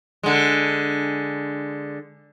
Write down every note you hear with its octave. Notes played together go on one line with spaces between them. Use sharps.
D3 G#3